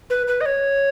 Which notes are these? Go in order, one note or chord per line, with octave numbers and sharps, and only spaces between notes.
B4
B4
D#5
C#5